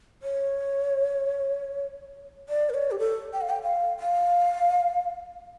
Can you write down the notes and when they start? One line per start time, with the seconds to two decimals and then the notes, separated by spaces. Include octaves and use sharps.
0.23 C#5
2.49 D5
2.70 A#4
2.74 C#5
2.91 G4
2.99 A4
3.33 G5
3.41 F5
3.50 G5
3.63 F5
4.00 F5